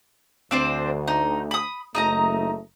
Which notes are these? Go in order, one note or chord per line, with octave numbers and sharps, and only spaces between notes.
D2 C4 D4 C5
D#4
B5 D#6
F#1 A3 D#4 D#5 A#5